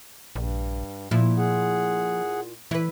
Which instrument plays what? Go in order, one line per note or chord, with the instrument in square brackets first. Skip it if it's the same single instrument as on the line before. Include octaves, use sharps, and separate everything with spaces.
[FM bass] A#1 [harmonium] G2
[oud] A#2 E4 [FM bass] F3
[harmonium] G#4 F#5
[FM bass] E3 [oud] E4 B4